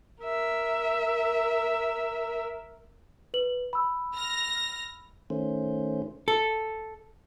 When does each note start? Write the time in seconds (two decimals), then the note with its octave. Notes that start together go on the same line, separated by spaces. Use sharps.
0.22 A#4 E5
3.34 B4 F#7
3.73 B5 E6
4.15 F6 A#6
5.30 D#3 A3 C#4 C5
6.28 A4